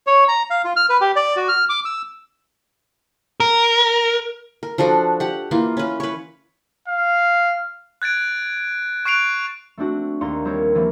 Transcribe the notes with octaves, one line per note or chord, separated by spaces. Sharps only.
C#5
A#5
F5
F4
F6
B4
G4
D5
F#4
F6
D6
E6
A#4
A#4
F3 D4 F#4 A4
G4 F#5
E3 A#3 F4
C#4 B4
B4 C#5
F5
F#6 G#6 A6 D7
C#6 F#6 C7 D7 F7
A3 C4 D4 F#4
D#2 D5 F5 A#5 C6 C#7
G3 C4 F4 A#4 C#5
E3 F3 A#3 C4